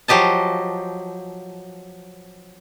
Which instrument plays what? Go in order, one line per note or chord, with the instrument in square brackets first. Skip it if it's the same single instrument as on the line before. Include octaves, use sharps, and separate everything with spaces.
[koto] F3 F#3 G4 D#5 A5